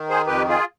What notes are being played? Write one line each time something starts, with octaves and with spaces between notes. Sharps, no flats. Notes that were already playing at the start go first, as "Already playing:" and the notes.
Already playing: D#3
G#4 C5
F2 G4 B4
F4 G#4